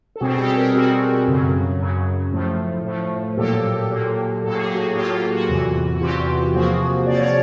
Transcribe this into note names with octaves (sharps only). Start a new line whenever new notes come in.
A4
B2 G3 C4 F#4 G#4
G#4
G4 A4
G#4 A#4
B2 G3 C4 F#4
F#2 C#3 F#3
F#2 C#3 F#3
A2 F3 A3
A2 F3 A3
A#2 F#3 A#3 G4 A4
A#2 F#3 A#3
A2 F#3 A#3 A4
G#4
G4
F#4 G#4
A2 F#3 A#3 F4 G4
F4
F#4
E2 C3 E3 F#4
F#4
E2 C3 E3 F4 G4
C3 F3 A#3 F#4 G#4
C3 F3 A#3 D5
C#5